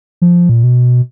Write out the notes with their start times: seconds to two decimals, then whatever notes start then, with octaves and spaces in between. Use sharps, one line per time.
0.22 F3
0.49 A#2
0.64 B2